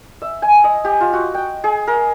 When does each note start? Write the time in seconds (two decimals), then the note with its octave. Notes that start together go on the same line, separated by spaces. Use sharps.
0.22 E5
0.42 G#5
0.64 D#5
0.85 G4
1.01 F4
1.13 F#4
1.34 G5
1.64 G#4
1.88 A#4